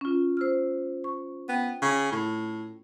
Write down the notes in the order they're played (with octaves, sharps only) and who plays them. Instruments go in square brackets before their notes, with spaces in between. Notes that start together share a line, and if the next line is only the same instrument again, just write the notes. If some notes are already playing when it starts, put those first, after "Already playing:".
[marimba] C#4 F4
C5 E6 F6
C#6
[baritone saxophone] B3 [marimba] G5
[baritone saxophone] C#3
A2